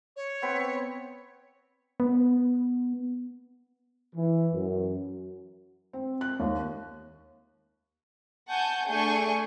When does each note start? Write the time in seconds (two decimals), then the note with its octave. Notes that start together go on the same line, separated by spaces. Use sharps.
0.16 C#5
0.42 B3 C4 B5
2.00 B3
4.14 E3
4.52 F#2
5.93 C4
6.21 F#6
6.39 D#2
8.50 F#5 G#5 A5 C#6 G6
8.87 A3 D4 G#4 G#5 C#6 G6